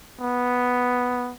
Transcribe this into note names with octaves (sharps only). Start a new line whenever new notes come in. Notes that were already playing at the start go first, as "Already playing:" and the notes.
B3